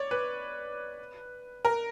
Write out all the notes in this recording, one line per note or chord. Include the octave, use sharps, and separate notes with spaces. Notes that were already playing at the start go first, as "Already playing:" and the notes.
Already playing: C#5 D5
B4
A#4